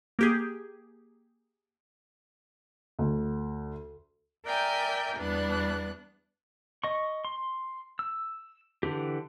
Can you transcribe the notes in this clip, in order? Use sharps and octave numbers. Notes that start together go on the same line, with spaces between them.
A#3 G4 G#4
D2
A#4 D5 E5 G5 G#5 G6
E2 G3 B3 D4 F#6
D#5 C#6
C6
E6
D3 E3 G4